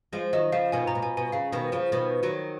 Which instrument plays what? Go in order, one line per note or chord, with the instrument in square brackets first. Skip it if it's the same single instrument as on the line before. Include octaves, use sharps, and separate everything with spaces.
[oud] F3 G#3
[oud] D#3 F#3 [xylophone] D#5
[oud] C#3 F3 [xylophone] F5
[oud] B2 D#3 [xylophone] G#5
[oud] B2 [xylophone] A#5
[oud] A#2
[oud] B2 [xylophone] G#5
[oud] B2 [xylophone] G#5
[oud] C#3 [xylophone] F5
[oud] B2 D#3
C#3 F3
B2 D#3
D#3 F#3